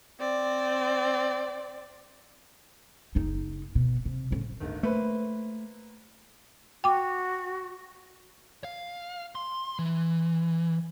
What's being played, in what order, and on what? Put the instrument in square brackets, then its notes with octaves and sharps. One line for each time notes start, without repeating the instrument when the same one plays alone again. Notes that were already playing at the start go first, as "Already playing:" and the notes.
[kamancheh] C4 D5
[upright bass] F#1 D#4
B2
C3
A2 C#3
[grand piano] D1 G1 D#3
[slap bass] A3 [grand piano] A#3 B4 C5
[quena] F#4 [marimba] G5 D6
[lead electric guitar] F5
C6
E3